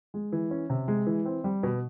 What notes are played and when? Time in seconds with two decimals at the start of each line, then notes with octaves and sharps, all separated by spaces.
0.14 G#3
0.32 E3
0.51 C#4
0.70 C3
0.88 G#3
1.07 E3
1.25 C4
1.44 G3
1.63 B2